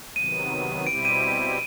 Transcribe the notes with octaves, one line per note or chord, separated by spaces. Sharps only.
C3 D#3 F#3 B3 D#7
B2 G3 C4 E4 G4 D7
D#7